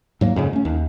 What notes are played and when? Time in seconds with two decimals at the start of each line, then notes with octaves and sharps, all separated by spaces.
0.21 G#2 F#3 A#3
0.36 F2 G#2 C#3
0.53 A3 C#4
0.65 D#2